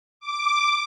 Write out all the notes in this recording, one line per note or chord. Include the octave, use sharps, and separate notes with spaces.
D6